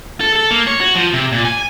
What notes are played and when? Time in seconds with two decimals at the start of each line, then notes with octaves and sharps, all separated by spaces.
0.21 A4
0.36 A4
0.51 A#3
0.67 C#5
0.80 F#4
0.96 F3
1.13 C3
1.32 A#2
1.45 G#5